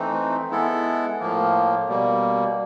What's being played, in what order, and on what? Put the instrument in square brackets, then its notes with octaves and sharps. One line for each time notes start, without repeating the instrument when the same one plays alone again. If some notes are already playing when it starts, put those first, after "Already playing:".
Already playing: [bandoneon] E3 A3 C4 D#4
G#3 B3 E4 A4
A2 F3 A#3
B2 G3 A#3